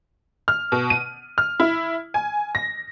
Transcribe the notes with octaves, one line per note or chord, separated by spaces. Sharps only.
F6
B2
D#7
F6
E4
G#5
A#6